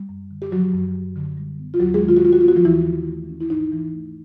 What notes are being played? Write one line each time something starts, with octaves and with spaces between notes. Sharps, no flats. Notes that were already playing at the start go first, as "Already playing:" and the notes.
Already playing: G3
F#2
D3
G4
F3 F#3 F#4
F#2
F#2
D3
G3
B3
F4
D#2 F#3 F#4
G#3 G#4
D#3
F4
F#4
G3 F4
F#4
F4
B3 F#4
F3 F4
D#2 E3 E4
D#3
A3
C#4
E4
G#2 D#4
E3
A3